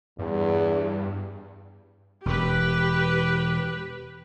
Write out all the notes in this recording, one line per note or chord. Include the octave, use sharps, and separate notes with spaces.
E2 G2
E1 G4 B4